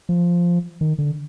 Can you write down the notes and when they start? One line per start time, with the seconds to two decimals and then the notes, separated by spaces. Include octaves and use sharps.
0.09 F3
0.81 D#3
0.99 D3